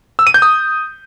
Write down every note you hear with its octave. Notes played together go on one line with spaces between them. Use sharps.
E6
D#7
G6
D#6